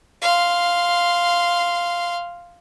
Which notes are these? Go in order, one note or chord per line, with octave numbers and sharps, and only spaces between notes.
F5 C6